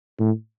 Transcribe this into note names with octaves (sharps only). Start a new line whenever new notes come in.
A2